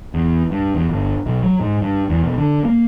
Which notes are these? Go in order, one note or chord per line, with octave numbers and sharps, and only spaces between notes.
E2
G2
E2
G1
B1
F#3
G#2
G2
E2
B1
D3
A#3